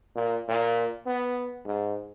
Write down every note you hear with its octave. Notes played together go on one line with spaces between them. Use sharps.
A#2
A#2
B3
G#2